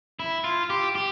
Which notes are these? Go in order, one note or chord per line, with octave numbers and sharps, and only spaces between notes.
E4
F4
G4
G4